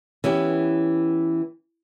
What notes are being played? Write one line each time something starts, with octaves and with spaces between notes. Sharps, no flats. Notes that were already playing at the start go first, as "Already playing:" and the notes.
E3 B3 C#4 G4